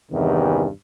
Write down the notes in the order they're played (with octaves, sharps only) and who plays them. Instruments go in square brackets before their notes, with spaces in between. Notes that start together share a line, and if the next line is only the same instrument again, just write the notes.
[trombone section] E2 G2 C3 D#3 E3